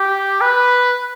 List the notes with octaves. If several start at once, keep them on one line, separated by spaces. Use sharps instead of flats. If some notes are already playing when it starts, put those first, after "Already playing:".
Already playing: G4
B4